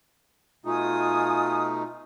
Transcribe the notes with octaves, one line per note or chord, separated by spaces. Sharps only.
B2 A3 D#4 F4 G#5 D#6